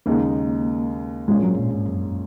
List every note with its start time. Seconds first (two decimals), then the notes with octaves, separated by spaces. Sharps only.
0.06 D#2 C#3 G#3 A#3 D#4
1.28 A#1 G#2 F3 G#3 A#3 C#4
1.43 F#3
1.59 A#2
1.74 G#2
1.89 F#2